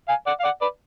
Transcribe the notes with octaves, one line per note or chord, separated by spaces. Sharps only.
F5 G#5
D5 F#5
F5
D5 F#5
B4 D5